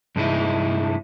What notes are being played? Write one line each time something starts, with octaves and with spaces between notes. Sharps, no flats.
G2 C3 G#3 D#4 E4